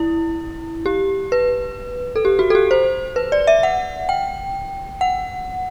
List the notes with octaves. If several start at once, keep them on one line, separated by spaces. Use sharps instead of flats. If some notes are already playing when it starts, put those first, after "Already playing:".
Already playing: E4
G4
B4
A4
G4
F#4
A4
G4
C5
B4
D5
E5
F#5
G5
F#5